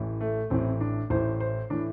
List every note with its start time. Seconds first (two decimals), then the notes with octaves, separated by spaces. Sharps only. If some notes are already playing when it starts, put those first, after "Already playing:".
Already playing: A1 A2 E3
0.21 A3
0.50 A1 A2 E3 C4
0.81 D4
1.10 A1 A2 E3 C5
1.40 C5
1.70 A2 E3 D4